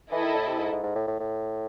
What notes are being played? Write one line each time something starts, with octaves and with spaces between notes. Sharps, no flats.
E3 E4 A4 D#5
D#3
A2
C3
G#2
G#2
G#2
A2
A2
A2